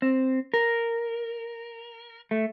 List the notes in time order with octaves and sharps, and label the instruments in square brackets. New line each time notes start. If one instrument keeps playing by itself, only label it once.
[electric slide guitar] C4
A#4
A3